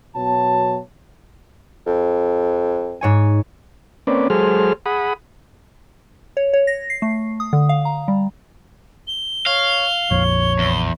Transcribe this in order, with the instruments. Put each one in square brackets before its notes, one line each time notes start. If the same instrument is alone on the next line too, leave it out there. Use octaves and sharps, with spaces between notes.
[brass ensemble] B2 F#3 C#5 A5
[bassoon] F2
[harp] G#2 C#5 G#5
[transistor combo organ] A#3 C4 C#4 B4 D5
F#3 G#3 G#4 A4 C5 F6
G#4 F#5 B5 D#6
[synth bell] C#5
C#5
A#6
C7
A3
D#6
D3
F5
A#5
G3
[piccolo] G7
[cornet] C#5 [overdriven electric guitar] F5
[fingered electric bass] A#1 F2 [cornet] C#5
[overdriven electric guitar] E2 [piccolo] G7